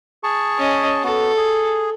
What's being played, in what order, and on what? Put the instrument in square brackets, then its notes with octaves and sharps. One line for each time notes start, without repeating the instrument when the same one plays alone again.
[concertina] G#4 A5 C#6
[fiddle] C#4 D#5
[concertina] B3 F#4 [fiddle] A4
[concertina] G#4